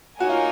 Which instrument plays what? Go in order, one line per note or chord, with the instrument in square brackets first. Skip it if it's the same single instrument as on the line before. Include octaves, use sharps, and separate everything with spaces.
[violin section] A#3 D#4 A#4 C#5 G#5 [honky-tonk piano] F#4
[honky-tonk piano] F4